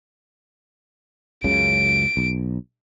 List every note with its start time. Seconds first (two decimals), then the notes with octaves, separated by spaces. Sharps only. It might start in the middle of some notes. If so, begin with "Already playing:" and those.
1.44 C#2 F#2 C#3 D7
2.17 B1